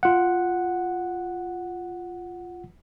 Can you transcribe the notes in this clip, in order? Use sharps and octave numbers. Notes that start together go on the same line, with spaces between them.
F4 F#5